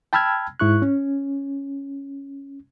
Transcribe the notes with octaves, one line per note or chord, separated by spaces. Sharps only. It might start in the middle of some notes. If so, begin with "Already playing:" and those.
G5 A5 B5 E6 F6 G#6
G#2 E4 C#6 F#6
C#4